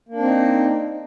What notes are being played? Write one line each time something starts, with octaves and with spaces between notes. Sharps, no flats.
A#3 C4 D4 D#4